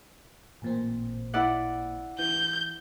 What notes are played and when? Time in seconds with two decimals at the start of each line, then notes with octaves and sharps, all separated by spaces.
0.62 A1 A#2 C4
1.34 E4 D5 F#5
2.19 E3 G6